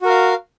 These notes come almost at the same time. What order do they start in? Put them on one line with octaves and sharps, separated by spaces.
F#4 A#4 F5